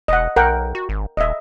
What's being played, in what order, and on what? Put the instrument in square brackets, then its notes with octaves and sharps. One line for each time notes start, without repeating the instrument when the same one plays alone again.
[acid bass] E1 [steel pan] D#5 F#5
[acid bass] B1 [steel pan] A#4 F#5 G5
[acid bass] F#4
G#1
[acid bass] D#1 [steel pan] D#5 E5